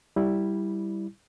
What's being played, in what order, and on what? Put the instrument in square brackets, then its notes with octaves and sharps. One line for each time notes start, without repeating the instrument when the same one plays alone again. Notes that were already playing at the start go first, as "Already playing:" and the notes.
[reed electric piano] G3 E4